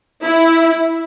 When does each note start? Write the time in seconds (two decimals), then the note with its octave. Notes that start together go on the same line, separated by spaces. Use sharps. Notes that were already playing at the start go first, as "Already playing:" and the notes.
0.24 E4